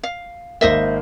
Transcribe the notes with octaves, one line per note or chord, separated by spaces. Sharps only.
F5
G#1 A#3 C5 D#5 E5